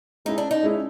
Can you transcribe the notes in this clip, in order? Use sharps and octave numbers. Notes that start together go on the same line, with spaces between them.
G#3 C#4 D#4 E4 G#4
D4
D#4
G#3 C#4 E4 G#4